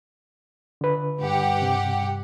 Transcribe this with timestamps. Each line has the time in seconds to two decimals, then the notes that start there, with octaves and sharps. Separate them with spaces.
0.81 D3 B4
1.19 G2 G4 F#5
1.62 C3